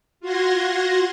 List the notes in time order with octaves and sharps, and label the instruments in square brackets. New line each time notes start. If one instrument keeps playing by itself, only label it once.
[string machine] F4 F#4 F#5 C6 G#6 A#6